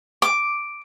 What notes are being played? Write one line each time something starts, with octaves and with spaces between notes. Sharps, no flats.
D6